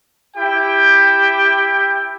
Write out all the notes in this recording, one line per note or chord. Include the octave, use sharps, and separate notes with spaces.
E4 G4 G5